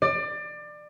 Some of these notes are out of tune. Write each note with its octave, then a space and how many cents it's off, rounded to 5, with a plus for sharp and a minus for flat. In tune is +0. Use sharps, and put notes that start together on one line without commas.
D5 +25